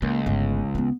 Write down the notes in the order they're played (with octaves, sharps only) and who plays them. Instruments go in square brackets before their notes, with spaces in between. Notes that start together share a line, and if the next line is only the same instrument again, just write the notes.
[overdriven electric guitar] C#2 [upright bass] A#3
[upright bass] G1 A3
B3 C4